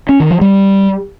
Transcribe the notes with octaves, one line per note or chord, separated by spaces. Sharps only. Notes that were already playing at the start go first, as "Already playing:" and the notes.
C#4
D#3
F3
G3